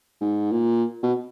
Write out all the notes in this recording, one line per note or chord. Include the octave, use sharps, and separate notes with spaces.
G#2
A#2
B2